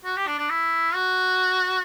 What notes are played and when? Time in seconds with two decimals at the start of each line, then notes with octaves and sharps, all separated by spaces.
0.05 F#4
0.16 G4
0.27 D4
0.38 D4
0.50 E4
0.94 F#4